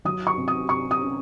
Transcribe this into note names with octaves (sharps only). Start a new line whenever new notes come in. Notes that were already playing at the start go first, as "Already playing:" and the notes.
F#3 D#6
C#6
C3
D#6
C3 C#6
D#6
C#4